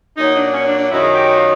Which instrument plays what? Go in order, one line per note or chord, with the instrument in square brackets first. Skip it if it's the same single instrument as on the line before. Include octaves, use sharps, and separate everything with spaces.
[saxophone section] A#2 F#3 D#4
D4
C#4
D4
D4
F#2 D#3 F#3 E4
G#4
G4
F4